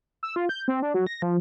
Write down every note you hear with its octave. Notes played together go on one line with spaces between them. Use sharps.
E6
F4
G6
C4
D4
F#3
A#6
F3